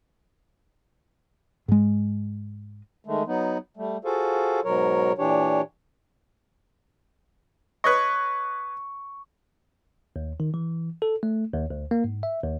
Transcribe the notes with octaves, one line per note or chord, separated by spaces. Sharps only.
G#2 G#3
D#3 G#3 A3
F#3 B3 D#4
G3 A3
F4 F#4 G#4 A4 C5 F5
G#2 B2 F#3 A#4 C#5
A#2 E3 D4 G4 C#5
B4 C#5 D#5 C#6
D#2
D#3
E3
A4
A3
D#2
D2
A#3
G#2
E5
D#2